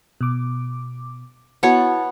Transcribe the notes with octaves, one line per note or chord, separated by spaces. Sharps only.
B2 D6
B3 E4 F#4 C#5 A5